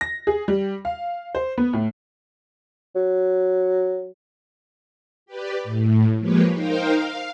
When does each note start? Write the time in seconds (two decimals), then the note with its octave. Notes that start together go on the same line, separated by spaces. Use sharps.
0.01 A#6
0.27 G#4
0.48 G3
0.85 F5
1.35 C5
1.58 B3
1.73 A2
2.96 F#3
5.26 G4 B4 D5
5.64 A2
6.20 F3 G#3 A#3 G4 B4 C#5
6.51 D#4 A#4 C5 F5 G5
6.92 F5